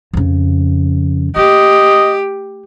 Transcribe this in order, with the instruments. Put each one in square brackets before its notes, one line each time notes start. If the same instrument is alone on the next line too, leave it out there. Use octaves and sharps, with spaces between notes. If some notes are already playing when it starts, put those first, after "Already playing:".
[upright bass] F2 C#3
[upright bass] A3 [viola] G4 [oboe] D#5